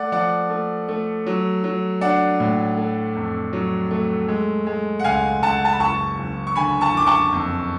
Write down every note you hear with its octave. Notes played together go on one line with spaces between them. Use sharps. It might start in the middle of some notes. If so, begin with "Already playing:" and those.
Already playing: A3 D5 F#5
F3 D5 F#5
A3
A3
F#3
F#3
D4 D5 F#5
A2
A3
F2
F#3
A3
G#3
G#3
F#5
C#2 F5 G#5
C#2 F#5 A5
A5
B5
F#1 A5 C#6
F#1
C#6
D3 G#5 B5
A5 C#6
F#1 D6
A5 C#6
F2